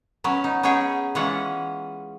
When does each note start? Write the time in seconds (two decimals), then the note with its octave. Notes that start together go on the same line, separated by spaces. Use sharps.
0.24 F#3 B3 C#4
0.44 D#4
0.63 B3 C#4 D#4 G#4 C#5 G5
1.15 E3 G#3 C#4 F4 C#5 F#5